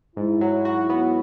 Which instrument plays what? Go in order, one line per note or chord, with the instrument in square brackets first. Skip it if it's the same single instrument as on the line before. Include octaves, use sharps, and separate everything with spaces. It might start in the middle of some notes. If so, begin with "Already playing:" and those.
[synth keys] G#2 [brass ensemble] E4
[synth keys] F#3
F#4
B3